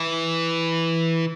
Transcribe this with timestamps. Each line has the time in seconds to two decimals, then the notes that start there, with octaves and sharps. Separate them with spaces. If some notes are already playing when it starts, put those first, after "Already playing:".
Already playing: E3